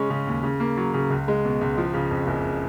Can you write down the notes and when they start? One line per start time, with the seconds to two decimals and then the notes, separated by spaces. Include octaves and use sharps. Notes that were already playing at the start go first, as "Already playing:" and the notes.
Already playing: C#3 G#3 C#4
0.10 C#3
0.27 D#2
0.43 C#3
0.60 A#3
0.77 F#3
0.94 C#3
1.10 C#2
1.28 G#3
1.45 B2
1.61 C#2
1.78 F3
1.94 C#3
2.11 F2
2.27 F#1